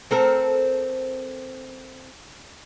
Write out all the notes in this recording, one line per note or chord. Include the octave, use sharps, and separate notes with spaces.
C4 A4 A#4